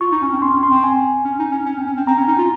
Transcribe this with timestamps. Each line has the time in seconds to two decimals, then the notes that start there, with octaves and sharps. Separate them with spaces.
0.01 F4 C#6
0.11 D#4
0.22 C#4
0.32 C4
0.42 C#4 C6
0.56 C#4
0.63 C6
0.70 C4
0.84 G#5
1.25 C#4
1.39 D#4
1.52 C#4
1.66 C#4
1.77 C4
1.86 C#4
1.97 C4
2.07 C4 A#5
2.18 C#4
2.27 D#4
2.38 F4